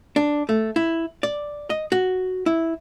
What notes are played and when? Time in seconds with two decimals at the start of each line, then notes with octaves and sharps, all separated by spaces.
0.16 D4
0.49 A3
0.76 E4
1.23 D5
1.70 D#5
1.92 F#4
2.46 E4